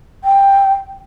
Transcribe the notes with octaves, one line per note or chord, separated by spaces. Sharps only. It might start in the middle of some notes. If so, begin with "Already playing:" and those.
G5